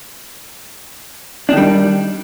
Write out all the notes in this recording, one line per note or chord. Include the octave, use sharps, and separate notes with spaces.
D#3 G3 D4